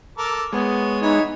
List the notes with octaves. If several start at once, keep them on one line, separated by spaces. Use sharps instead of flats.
A4 A#4 D6
G#3 B3 C#5
E3 D#4 C#5